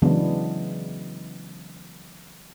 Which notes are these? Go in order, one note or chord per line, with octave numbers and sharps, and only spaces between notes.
C#3 E3 F#3 G#3 B3 D4